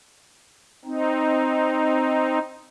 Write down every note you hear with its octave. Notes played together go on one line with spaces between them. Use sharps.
C4 D#4